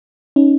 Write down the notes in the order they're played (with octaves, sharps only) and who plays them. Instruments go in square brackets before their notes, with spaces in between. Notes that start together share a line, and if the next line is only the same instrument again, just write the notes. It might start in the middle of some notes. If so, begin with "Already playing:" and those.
[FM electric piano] C#4 D#4